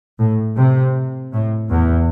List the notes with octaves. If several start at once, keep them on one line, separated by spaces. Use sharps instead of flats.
A2
C3
A2
E2